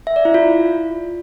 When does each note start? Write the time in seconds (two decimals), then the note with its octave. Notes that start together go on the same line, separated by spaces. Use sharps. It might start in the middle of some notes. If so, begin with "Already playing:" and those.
0.07 E5
0.16 D5
0.25 E4
0.34 F4